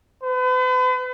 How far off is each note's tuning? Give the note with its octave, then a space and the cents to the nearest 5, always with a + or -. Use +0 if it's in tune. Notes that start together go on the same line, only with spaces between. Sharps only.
B4 +40